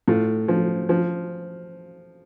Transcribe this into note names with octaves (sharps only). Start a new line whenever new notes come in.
A2 F4
F3
F3